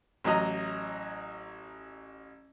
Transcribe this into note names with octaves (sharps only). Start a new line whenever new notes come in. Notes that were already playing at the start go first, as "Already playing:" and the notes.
A1 F#3 D#5 A#5